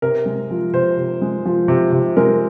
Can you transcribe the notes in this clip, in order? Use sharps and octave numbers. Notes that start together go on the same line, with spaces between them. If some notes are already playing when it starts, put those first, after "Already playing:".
C3 A#4
G#3
F3
C3 C5
C3
G#3
F3
C3
C3
G#3 A#4